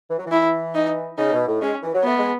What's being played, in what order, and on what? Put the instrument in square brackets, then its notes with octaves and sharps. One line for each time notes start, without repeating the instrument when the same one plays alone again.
[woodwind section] E3
F#3
E3
[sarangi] E4
D#4
[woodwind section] C#3 [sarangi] D#4
[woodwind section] B2
A2
[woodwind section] G#3 [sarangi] C#4
[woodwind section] E3
F#3
[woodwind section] A3 [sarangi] B3
[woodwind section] G#3